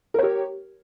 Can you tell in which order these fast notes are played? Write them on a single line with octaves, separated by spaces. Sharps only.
A#4 C#5 G4